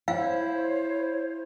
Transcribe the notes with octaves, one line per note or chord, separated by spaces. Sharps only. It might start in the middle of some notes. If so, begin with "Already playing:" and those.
E4 C5 C#5 F5